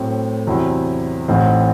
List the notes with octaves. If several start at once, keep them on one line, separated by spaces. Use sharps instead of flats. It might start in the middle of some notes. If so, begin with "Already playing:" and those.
Already playing: A2 F#3 A3 C4
E2 C3 F#3 C4 E4
A1 A2 E3 C4 D#4